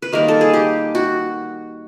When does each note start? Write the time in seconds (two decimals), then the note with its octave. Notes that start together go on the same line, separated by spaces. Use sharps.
0.02 B4
0.12 D#3 G3 A#3 A#4
0.28 A4
0.41 G#4
0.53 G4
0.95 F#4